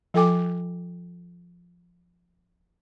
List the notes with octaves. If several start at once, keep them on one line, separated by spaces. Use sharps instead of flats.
F3 F4 A4 G5 G#5 D6